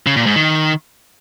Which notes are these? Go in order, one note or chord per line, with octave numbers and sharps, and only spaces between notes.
C#3
A#2
G#2
D#3